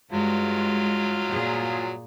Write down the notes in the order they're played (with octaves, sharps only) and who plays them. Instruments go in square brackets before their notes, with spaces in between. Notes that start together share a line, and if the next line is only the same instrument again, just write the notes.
[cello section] G2 G#3 [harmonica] F#3 F4
[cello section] A#2 G#4